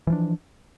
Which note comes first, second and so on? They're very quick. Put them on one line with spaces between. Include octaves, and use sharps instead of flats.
E3 F3 D4